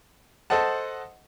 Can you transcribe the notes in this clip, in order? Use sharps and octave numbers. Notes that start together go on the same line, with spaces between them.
A4 C5 D#5 F#5 A5